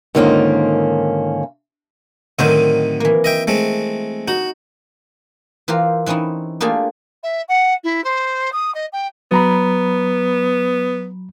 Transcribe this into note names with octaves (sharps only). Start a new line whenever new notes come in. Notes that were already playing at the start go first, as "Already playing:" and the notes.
G#2 D3 D#3 A#3 C#4 F4
A2 D3 D#3 F#3 C4 D#4
E3 A#3
D#5 E5 G5
G#3 A3 C4
D#4 F#4
E3 F4 G4 A#4 C5
E3 C4 C#4 D#4 E4
A3 A#3 D4 F4 G4 G#4
E5
F#5
E4
C5
D#6
D#5
G5
F#3 B3 A#5 B5